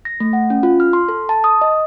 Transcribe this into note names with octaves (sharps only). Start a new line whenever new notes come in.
A#6
A3
F#5
C#4
F4
F6
C6
A4
A5
D#6
D#5